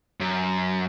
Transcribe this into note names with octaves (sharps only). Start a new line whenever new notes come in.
F#2